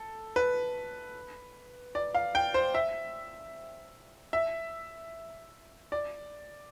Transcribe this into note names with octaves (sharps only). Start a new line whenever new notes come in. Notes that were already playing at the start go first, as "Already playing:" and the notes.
Already playing: A4
B4
D5
F5
G5
C5
E5
E5
D5